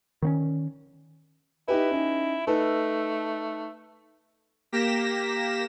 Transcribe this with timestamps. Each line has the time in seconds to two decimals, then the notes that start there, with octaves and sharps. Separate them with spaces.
0.22 D#3 C4 C#4
1.68 D#4 E4 G4 B4
1.91 C#4 D#4
2.47 A3 D#4 A4 B4
4.72 A#3 G4 A#6 B6 E7